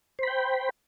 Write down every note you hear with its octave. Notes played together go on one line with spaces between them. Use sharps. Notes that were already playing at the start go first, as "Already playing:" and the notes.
C5 G5 B5